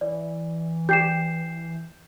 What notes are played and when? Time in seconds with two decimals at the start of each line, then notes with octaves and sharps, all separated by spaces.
0.01 E3 D5
0.89 G4 G6 C7 E7